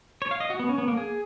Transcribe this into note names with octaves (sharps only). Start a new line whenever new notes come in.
C#5
F5
D#5
F#4
B3
C#4
B3
A#3
G#4